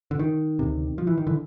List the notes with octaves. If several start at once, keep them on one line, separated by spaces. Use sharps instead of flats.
D3
D#3
D2 C3
F3
E3
D#3
D3 E3